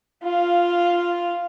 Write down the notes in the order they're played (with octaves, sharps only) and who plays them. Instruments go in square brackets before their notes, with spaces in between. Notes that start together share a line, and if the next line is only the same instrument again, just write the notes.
[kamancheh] F4 F5